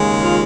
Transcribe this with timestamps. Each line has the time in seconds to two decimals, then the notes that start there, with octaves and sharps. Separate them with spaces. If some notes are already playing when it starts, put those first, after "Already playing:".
Already playing: D#2 C#3 G#3
0.22 F4